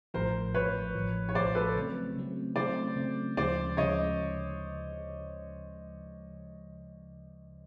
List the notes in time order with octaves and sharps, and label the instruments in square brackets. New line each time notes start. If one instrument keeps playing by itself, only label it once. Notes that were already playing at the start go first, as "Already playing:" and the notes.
[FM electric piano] A1 A2 F3 [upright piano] A#4 C5
[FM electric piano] A1 A2 F3 [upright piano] B4 C#5
[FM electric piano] A1 A2 F3
[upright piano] C#5
[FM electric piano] A1 A2 F3 [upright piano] C5 D5
[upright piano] A4 B4
[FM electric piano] C#3 F#3 A3 C4
C#3 F#3 A3 C4
[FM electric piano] C#3 F#3 A3 C4 [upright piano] C5 D5
[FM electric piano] C#3 F#3 A3 C4
[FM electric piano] D2 C#3 F3 G#3 [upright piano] C5 D5
[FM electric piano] D2 C#3 F3 G#3 [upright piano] C#5 D#5